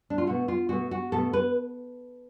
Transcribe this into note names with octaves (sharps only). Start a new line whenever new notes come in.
D4
F4
B2 A3 F#4
F4
B2 A3 F#4
F#4
B2 A3 A4
B4